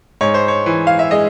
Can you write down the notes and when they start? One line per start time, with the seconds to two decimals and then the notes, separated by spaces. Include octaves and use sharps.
0.21 G#2 C#5
0.34 C5
0.48 C#5
0.66 E3
0.87 F5
0.99 E5
1.11 G#3 D#5